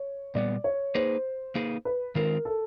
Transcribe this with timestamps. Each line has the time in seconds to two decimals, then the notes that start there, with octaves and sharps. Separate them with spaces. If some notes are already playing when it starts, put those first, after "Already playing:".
Already playing: C#5
0.35 A#2 G3 B3 D5
0.64 C#5
0.95 A#3 D#4 G#4 B4 C5
1.55 A#3 D#4 G#4 B4
1.85 B4
2.15 D#3 G#3 C4 F4 A#4
2.45 A4